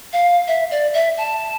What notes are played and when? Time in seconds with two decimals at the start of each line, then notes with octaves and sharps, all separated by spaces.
0.13 F5
0.48 E5
0.71 D5
0.94 E5
1.18 A5